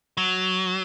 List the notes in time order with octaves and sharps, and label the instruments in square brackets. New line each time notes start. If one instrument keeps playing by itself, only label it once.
[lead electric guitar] F#3